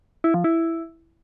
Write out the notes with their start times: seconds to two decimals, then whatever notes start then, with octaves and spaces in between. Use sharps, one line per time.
0.24 E4
0.34 F3
0.44 E4